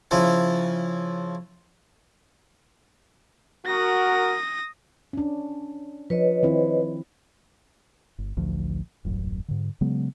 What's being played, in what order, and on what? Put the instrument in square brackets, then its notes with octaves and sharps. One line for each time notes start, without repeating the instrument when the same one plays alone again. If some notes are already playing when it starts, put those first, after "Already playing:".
[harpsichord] C#3 F3 E4
[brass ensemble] F#4 A#4 [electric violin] D#6 A#6
[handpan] C#4 D4
[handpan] F3 [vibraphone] B4 C#5 D#5
[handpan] D#3 C4 E4
[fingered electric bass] G1
A1 D2 F3
D#1 A1 F#2
G#2 D3
C#3 F#3 G#3 B3